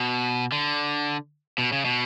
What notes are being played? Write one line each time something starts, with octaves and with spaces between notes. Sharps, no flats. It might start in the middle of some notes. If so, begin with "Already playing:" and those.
Already playing: B2
D3
B2
C#3
B2